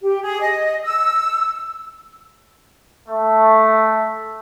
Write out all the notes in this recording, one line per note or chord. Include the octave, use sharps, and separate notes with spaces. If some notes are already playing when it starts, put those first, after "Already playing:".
G4
G#4
D#5
E6
A3